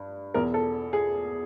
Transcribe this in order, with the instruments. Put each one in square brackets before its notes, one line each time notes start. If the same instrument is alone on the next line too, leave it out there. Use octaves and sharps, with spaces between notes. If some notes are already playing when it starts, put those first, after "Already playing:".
Already playing: [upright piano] G2
E2 B2 A#4
A4
G#4